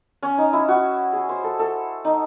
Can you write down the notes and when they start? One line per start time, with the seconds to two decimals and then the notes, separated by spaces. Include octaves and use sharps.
0.23 C#4
0.38 D#4
0.53 E4
0.68 F#4
1.13 G#4
1.29 C5
1.44 A4
1.59 A4
2.05 D#4